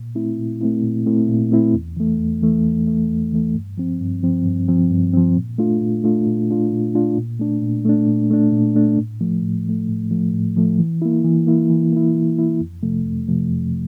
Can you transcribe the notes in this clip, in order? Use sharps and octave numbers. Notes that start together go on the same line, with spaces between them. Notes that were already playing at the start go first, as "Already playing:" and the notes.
Already playing: A#2
A3 C4 E4
A#2
A3 C4 E4
A#2
A3 C4 E4
A#2
A3 C4 E4
E2
E3 A3
E2
E3 A3
E2
E3 A3
E2
E3 A3
G2
F3 C4
G2
F3 C4
G2
F3 C4
G2
F3 C4
A#2
A3 D4 F4
A#2
A3 D4 F4
A#2
A3 D4 F4
A#2
A3 D4 F4
A#2
A3 D4
A#2
A3 D4
A#2
A3 D4
A#2
A3 D4
A2
F3 A3
A2
F3 A3
A2
F3 A3
A2
F3 A3
E3
A#3 E4
E3
A#3 E4
E3
A#3 E4
E3
A#3 E4
F2
C3 F3 A3
F2
C3 F3 A3
F2